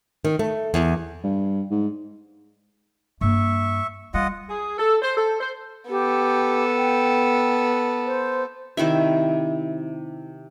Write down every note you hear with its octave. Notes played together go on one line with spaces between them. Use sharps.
D#3
A3
E2
G2
G#2
G2 A#3 E5 C#6
G3 F4 D#5 F#5
G#4
A4
C5
A4
C5
B3 G4 A4
G5
C5
C3 D#3 E4 E5